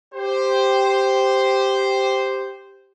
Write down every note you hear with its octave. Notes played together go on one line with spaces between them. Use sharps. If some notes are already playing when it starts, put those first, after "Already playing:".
G4 C5